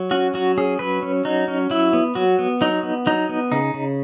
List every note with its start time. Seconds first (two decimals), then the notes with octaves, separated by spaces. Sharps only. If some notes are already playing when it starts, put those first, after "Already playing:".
Already playing: F#3
0.11 C#4 F#4
0.34 F#3 F#4
0.58 C#4 G#4
0.79 F#3 B4
1.03 C#4
1.25 F#3 D#4
1.48 C#4
1.70 F#3 E4
1.93 B3
2.15 F#3 F#4
2.39 B3
2.61 F#3 D#4
2.83 B3
3.06 F#3 D#4
3.29 B3
3.52 C#3 D#4
3.74 C#3